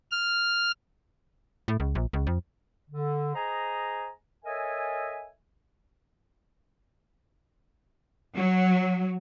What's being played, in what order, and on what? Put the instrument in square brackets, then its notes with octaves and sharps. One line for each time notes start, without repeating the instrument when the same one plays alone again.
[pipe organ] F6
[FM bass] A2
C#2
A#1
C#2
F2
[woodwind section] D3
G#4 C5 D#5 G#5 A#5
A4 A#4 C#5 D#5 E5 G#5
[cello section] F#3